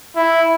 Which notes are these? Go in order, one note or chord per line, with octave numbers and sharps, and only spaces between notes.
E4